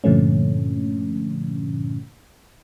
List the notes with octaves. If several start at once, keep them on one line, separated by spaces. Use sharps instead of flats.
G2 A#2 D3 F3 A3 C#4